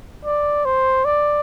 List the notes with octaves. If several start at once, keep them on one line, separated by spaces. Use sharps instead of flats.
D5
C5
D5